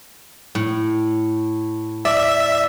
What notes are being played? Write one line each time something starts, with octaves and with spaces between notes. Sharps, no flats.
A2
D5 E5